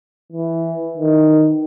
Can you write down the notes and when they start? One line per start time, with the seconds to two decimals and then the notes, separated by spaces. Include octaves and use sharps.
0.32 E3
0.97 D#3